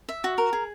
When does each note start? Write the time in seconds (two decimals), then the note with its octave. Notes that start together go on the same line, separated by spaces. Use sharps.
0.09 E5
0.24 F#4
0.38 A#4
0.53 G#4